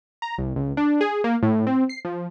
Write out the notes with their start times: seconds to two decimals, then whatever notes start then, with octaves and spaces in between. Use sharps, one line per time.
0.22 A#5
0.38 C2
0.56 C#2
0.77 D4
1.01 G#4
1.24 A#3
1.43 A2
1.67 C4
1.89 C7
2.05 F3